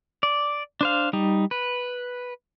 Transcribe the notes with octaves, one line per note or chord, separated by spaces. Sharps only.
D5
D4 C5 F5
G3 D#4
B4